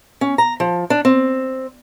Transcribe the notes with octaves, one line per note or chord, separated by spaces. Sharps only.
C#4
A#5
F3
D4
C4